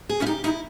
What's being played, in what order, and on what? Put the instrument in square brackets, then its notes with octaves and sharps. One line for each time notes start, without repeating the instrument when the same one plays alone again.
[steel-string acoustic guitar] G#4
[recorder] C#4 [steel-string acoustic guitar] E4
[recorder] D#4 [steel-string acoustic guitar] G4
[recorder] D#4 [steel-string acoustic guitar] E4